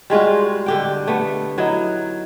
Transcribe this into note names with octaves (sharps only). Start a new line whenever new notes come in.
G3 G#3 F4 F#4
D3 G4 G5
A3 B3
F#3 D#4 E4